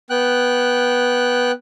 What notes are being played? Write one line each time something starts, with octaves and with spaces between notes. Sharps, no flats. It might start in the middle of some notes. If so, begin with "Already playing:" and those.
B3 G5 F#6